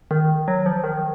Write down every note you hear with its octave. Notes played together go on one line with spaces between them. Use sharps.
D#3
F#3
F3
D#3